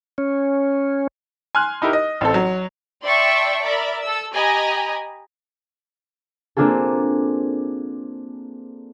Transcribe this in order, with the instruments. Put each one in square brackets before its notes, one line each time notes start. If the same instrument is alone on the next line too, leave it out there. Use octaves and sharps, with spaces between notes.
[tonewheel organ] C#4
[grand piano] G#5 C6 F6 F#6
D#4 E4 G4 A#4
D#5
A1 C4 A4
F#3
[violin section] D5 E5 G5 A5 C6 C#6
A#4 D5 E5 B5
A4 E6
G4 D#5 G#5 A#5 B5
[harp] A#3 C4 D4 F4 G#4 A4